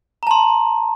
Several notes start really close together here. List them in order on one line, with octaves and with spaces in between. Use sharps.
A#5 A5 C6